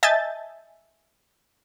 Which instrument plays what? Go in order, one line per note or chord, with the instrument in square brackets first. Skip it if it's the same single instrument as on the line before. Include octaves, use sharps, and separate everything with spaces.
[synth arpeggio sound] D#5 E5 G#5 A5 G6 A6